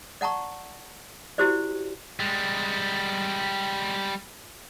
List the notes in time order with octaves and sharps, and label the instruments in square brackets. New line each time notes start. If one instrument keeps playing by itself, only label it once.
[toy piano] D5 F#5 A5 A#5 C#6
E4 F#4 G4 C5 D5
[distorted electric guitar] G3 G#3